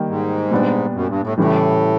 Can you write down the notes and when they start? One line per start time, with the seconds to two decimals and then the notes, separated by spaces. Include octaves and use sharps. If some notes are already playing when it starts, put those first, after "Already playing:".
Already playing: D#3 G3 A#3
0.08 G#2
0.51 A#2 G3 B3 D4
0.94 F#2
1.09 G2
1.23 A2
1.38 A2 C#3 E3 G3